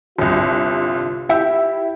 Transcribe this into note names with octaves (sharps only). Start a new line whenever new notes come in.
G1 C2 F4
E4 G4 E5